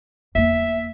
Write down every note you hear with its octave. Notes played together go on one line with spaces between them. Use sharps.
E2 A#3 E5